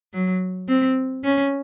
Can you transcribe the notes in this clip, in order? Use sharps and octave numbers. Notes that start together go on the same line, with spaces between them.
F#3
C4
C#4